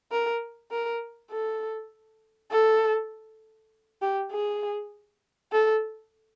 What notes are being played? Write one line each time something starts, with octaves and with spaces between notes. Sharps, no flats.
A#4
A#4
A4
A4
G4
G#4
A4